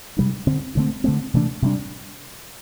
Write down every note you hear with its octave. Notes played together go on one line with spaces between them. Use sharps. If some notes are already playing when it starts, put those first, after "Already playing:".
C3 G3 D4
D3 C4
G2 D3 A3 C4
D3 A3 C4
C3 E3 A3 D4
C3 G3 D4